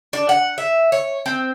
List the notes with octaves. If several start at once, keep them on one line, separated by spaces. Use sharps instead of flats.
D4
F#5
E5
C#5
C4